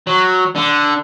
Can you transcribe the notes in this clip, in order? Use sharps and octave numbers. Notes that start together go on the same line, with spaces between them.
F#3
D3